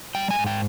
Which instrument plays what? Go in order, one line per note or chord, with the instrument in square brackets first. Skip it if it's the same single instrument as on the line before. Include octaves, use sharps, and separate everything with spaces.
[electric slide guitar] G3 G5
G#5
G#2
G5